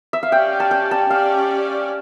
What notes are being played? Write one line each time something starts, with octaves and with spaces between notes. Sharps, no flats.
E5
F5
C#4 G4 D5 G5
A5
G5
A5
C#4 G4 D5 F5